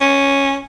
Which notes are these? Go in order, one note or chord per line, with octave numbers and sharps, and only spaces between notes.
C#4